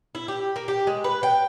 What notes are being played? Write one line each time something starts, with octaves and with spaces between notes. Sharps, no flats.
E4
G4
A#3
G4
G#3
B4
G5